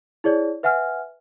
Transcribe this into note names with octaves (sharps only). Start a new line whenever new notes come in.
E4 G#4 C#5 D5
B4 E5 F#5 G#5 F6